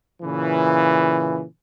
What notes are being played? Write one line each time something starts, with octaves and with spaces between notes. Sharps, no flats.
A#2 C#3 E3